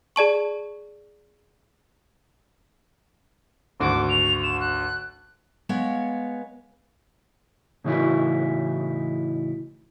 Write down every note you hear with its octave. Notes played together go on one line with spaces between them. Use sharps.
G#4 D5 A5 C#6
G#1 D2 F#4 D6
F7
E7
F#6
G#3 B3 C#5 F5
A2 C#3 E3 D#4 E4 F#4